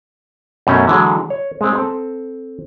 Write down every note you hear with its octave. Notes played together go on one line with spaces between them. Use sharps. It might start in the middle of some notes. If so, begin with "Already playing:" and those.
F#2 B2 A3 C#4
D3 E3 F#3 G#3
C#5
G#3 C4
C4 A4